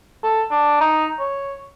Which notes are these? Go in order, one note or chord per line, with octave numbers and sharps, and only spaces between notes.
A4
D4
D#4
C#5